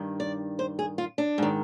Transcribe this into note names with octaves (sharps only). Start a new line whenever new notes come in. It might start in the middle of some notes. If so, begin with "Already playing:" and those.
Already playing: G2 D#3
D5
C5
G#4
F4
D4
G#2 D#3